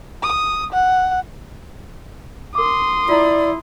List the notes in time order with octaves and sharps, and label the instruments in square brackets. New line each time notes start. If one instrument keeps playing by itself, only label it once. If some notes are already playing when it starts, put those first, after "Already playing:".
[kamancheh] D#6
F#5
[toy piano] A#4 D6 [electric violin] C6 D#6
[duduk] E4 [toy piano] F4 A#5 [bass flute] D5